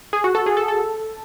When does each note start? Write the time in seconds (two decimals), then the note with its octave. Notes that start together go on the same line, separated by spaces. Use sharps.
0.13 G#4
0.24 F#4
0.35 A4
0.46 G#4
0.57 A4
0.68 A4